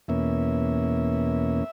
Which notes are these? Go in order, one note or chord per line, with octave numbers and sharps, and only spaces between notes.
E2 B2 A#3 C#4 E5